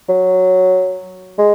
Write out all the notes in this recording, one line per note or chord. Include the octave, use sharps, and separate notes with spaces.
F#3
G#3